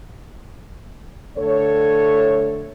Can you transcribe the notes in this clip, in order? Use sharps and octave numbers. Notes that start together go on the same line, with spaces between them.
D3 A3 A4 C#5